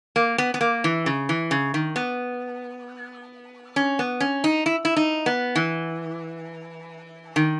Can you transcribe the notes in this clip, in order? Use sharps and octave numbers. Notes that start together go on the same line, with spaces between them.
A#3
B3
B3
A#3
E3
C#3
E3
C#3
D#3
B3
C#4
B3
C#4
D#4
E4
E4
D#4
B3
E3
D#3